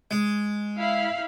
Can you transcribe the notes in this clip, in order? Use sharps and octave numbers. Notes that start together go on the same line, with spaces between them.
G#3
E4 F5 B5